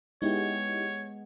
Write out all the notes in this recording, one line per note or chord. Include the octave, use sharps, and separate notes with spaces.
G#3 B3 D#4 E4 G4 C#5